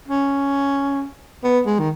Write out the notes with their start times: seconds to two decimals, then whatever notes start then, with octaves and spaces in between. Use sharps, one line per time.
0.08 C#4
1.44 B3
1.66 G#3
1.79 D#3